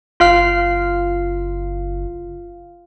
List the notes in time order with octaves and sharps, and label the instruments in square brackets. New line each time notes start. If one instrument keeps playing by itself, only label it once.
[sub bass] F#1 [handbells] F4 F5 F6